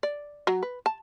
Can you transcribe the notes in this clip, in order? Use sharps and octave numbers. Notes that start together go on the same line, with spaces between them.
D5
F#3
B4
A5